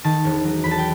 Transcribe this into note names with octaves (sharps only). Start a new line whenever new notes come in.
D#3 A5
E1
F#3
E2 B5
A5
G5